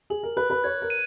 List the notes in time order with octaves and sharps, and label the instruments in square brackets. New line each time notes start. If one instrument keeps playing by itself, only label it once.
[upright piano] G#4 [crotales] F#7
[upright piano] A#4
[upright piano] B4 [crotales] F#6
[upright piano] B4
[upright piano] C#5 [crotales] G#6
[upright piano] A#4
[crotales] D#7